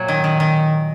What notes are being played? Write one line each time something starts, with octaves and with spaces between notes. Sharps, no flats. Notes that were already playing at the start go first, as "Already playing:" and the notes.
Already playing: A#2 F#3 A#3 C#5
D#3
D#3
D#3